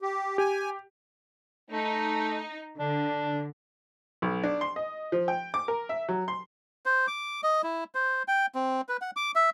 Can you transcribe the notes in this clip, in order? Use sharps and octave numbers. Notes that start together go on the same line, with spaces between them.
G4
G4 G#5
A3 D#4
D3 D4
B1
D4
C6
D#5
F3
G5
D6
A#4
E5
F#3
C6
C5
D6
D#5
E4
C5
G5
C4
B4
F#5
D6
E5